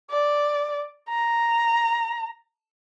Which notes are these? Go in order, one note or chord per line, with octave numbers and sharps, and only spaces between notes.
D5
A#5